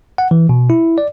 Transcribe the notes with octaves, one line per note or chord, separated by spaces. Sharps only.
F#5
E3
B2
E4
D5